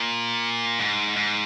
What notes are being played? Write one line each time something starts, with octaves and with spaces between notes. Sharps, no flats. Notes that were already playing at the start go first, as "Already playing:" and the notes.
Already playing: A#2
G#2
G#2